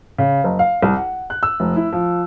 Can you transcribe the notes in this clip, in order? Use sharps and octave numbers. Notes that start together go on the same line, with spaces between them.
C#3
F#1
F5
C2
F#5
F#6
E6
F1
E4
F3